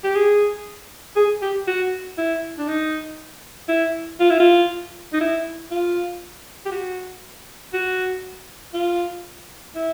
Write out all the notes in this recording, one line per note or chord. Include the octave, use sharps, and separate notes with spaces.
G4
G#4
G#4
G4
F#4
E4
D4
D#4
E4
F4
E4
F4
D#4
E4
F4
G4
F#4
F#4
F4
E4